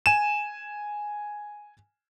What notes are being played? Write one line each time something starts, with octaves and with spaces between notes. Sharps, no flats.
G#5 D#7 E7